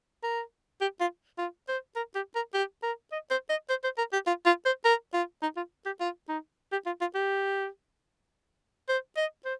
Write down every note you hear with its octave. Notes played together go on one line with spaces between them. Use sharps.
A#4
G4
F4
F4
C5
A#4
G4
A#4
G4
A#4
D#5
C5
D#5
C5
C5
A#4
G4
F4
F4
C5
A#4
F4
D#4
F4
G4
F4
D#4
G4
F4
F4
G4
C5
D#5
C5